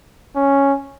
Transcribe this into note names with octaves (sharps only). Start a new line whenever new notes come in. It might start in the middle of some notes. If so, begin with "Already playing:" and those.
C#4